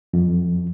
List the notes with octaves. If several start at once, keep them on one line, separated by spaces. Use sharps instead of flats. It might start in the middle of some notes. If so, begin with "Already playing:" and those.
F2